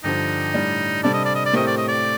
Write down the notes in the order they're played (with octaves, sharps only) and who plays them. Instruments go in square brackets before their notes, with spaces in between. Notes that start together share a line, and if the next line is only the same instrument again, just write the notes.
[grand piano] G2 D3 F3 [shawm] D#4
[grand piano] A2 G3 D4
[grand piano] C3 G3 D4 A4 [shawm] D5
[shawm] D#5
D5
D#5
D5
[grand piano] A2 A3 C4 G4 A#4 [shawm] D#5
[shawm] D5
D#5
D5